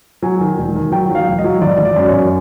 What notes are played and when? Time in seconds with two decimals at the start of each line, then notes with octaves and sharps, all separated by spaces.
0.22 F#3 G#5
0.41 D#3
0.58 E1
0.75 D#3
0.92 F#3 G5
1.10 F#3
1.15 F5
1.27 E1
1.39 D#5
1.44 F#3
1.62 G#1 D5
1.79 G#1
1.85 D5
1.96 F#2
2.08 C#5
2.14 F#2